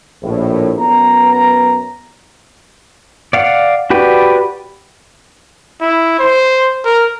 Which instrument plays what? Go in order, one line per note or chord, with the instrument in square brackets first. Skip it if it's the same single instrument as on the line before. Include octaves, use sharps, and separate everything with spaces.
[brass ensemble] A#1 A2
F#2 B3 B4 A#5
[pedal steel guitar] D5 F5 F#5
F#4 G4 B4 D5
[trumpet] E4
C5
A#4